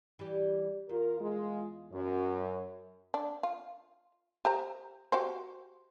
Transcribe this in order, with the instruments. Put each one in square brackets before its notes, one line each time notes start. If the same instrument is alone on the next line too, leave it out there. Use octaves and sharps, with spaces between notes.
[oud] E3 G3 G4
[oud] E2 [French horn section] F4 A#4
[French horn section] G#3 F4
F#2
[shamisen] D4
F4
G4 C5 A#5
F#4 G4 C5